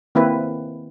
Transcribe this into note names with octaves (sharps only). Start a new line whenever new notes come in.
D#3 A#3 C4 E4 B4